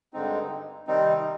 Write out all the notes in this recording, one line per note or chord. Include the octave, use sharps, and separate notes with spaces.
G2 D3 G#3 C4 D#4
C3 D#3 G3 C4 D#4